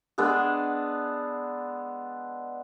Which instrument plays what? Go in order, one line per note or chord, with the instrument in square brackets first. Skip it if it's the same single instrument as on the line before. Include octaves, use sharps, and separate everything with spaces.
[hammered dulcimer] G#3 B3 D4 A4